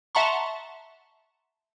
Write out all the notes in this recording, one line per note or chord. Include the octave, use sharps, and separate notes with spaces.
E5 F#5 A5 A#5 C6 C#6